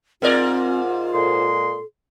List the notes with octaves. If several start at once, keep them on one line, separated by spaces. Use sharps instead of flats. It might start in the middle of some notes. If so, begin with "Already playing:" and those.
G#2 C4 F4 A#4 D5
A#2 G#3 A4 C6